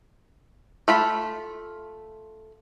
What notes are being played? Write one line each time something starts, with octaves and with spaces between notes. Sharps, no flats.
A3 F4 B5